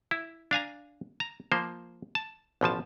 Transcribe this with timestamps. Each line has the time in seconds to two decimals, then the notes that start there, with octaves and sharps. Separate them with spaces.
0.11 E4
0.51 D4 F5 G#5 A#5
1.20 A#5
1.52 F3 A#3 C5
2.15 A5
2.61 A1 B2 F3 A5